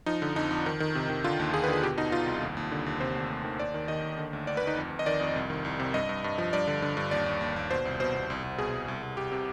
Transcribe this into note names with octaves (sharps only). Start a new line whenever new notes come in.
F3 D#4
D3
F2 D#4
F2
D#3
D#3
C3
D#3
D3 F4
D#2
D#2 G#4
B4
D3 G#4
B2 G4
B2 D#4
B2 F4
C2
D#2
D#2
D3
D#2
C3 C5
D2
D2
D#3
D#2 D5
D#3
D#3 D#5
D#2
D3
D2
D2 D5
B4
D2 D#4
F2
F2
D#5
D#3 D5
F2
C2
D#3
C2
C3
G2 D#5
G2
G2
F3
G2 D5
D3
D3
G2
D#2 D5
D#2
D#2
D#2
B2 C5
C2
B2 C5
B2
C2
C2
B2 G#4
C2
C2
C2
C2 G4
C3